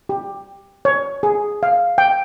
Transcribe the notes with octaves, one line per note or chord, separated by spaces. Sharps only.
G4
C#5
G#4
F5
G5